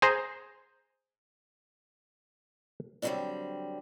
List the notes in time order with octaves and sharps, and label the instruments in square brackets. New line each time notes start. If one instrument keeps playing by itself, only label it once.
[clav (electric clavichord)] G#4 C5 A#5
[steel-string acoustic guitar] D3 F#3 G3 A3 C4 D4